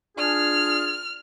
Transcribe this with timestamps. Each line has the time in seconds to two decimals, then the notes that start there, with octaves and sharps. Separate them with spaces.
0.18 D4 F4 G#4 F6